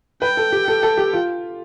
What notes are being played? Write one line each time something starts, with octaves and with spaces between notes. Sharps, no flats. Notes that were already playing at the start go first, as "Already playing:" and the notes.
B4 G5
A4
G4
A4
A4
G4
F4